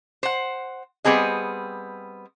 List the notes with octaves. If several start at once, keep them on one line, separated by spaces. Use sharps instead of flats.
C5 F#5
G3 B3 C4 G#4 D#5